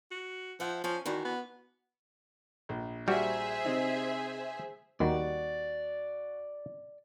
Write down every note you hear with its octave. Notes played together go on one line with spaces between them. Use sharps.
F#4
F3 E5 F#5
F3 C#4 G#5
D#3 E3 D4 F#4
B3
A#1
G3 F#4 G#4 C5 E5
C3 D#4
D#2 D#3 G3 F#4 D5